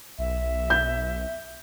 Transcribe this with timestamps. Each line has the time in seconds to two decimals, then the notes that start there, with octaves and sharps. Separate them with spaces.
0.19 B1 E5
0.70 G6